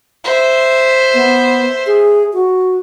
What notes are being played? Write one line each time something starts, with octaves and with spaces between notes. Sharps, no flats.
C5 E5
B3
G#4
F#4